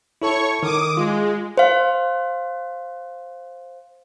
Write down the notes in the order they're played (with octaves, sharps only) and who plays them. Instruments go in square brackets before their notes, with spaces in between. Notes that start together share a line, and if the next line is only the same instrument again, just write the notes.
[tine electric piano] E4 A4 A5 [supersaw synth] C#5 C#6
[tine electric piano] D#3 [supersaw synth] D6 D#6
[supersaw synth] G#3 [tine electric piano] F4
[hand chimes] C5 F5